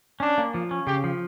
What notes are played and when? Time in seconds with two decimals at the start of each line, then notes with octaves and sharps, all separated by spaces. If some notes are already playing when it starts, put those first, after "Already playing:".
0.20 C#4 D4
0.38 A#3
0.54 F3
0.71 C#4
0.87 C#3 G4
1.04 F3